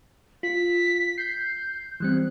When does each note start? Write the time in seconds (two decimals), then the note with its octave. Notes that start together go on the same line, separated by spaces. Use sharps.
0.43 F4 B6
1.18 G6 C7
2.00 E3 G3 C4 F#6